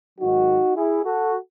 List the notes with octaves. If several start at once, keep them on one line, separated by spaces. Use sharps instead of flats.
G#2 D#3 F#3 D#4 F#4
E4 G#4
F#4 A4